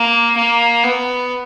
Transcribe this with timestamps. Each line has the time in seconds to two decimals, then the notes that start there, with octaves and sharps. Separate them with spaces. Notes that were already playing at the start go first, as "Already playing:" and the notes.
Already playing: A#3
0.38 A#3
0.84 B3